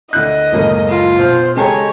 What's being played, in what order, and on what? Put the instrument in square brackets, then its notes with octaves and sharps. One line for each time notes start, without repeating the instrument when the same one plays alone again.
[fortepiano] D2 E4 F#6 [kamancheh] D#5
[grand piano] F#1 C#2 [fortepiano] A2 A#3 C#4
[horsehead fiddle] F4
[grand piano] B2 [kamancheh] C5 [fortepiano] F6
[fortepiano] C#3 A#5 [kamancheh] G#3 [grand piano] G4 A4 [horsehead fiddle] C#5